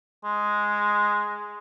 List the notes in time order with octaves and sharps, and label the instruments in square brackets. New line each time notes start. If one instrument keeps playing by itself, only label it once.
[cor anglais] G#3